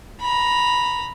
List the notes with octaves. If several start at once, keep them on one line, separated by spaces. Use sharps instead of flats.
A#5 B5